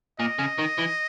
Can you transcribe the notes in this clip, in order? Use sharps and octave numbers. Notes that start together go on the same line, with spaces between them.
A#2 D#5
C#3
D#3
E3